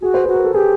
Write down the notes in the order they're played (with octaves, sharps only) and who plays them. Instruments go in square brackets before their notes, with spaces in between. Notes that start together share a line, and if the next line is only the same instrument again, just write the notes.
[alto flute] F#4 [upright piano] G#4
[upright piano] C5
[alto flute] F#4 [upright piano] B4
[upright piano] A#4
A4
[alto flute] G4 [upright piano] G#4